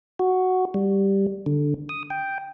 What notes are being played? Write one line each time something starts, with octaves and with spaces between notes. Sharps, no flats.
F#4
G3
D3
D#6
G5